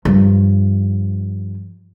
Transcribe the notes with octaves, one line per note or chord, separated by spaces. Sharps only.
G2 F3